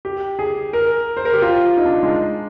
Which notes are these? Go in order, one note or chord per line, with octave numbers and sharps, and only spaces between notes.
G4
G#4
A#4
C5
A#4
G4
F4
D#4
D4
G#3